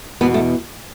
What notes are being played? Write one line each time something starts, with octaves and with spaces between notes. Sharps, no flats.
E2 B2 B3
A3